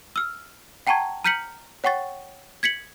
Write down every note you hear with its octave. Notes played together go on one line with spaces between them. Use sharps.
E6 F6
F#5 G5 A5 A#5 C#6 G#6
A#5 F6 G6 B6 C#7 F#7
C#5 F#5 G5 C#6 A6
G#6 B6 C#7 F#7